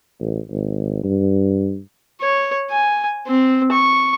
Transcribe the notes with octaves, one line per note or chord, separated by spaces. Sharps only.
A1
G#1
G2
C#5
G#5
C4
C#6